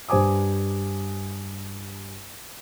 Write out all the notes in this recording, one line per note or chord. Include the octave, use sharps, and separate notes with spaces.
G2 C5 G#5 D6 D#6